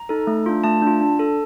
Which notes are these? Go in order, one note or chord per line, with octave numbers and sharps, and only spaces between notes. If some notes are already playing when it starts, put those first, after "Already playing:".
Already playing: A#5
D#4 A4
A3
D4 F4
A3 A5
D4 F4
D4
A4